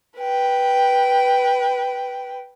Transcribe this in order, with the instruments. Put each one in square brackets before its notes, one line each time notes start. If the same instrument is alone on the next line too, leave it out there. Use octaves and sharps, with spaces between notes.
[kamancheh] B4 G5